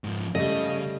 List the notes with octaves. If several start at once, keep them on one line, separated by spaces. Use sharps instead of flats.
G#2 F3
C#3 G3 A3 D#5